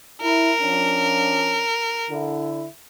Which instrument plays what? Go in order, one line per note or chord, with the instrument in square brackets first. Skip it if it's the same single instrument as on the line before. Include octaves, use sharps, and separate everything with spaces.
[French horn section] E4 [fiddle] A#4
[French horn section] F3 C#4 D4
D3 E4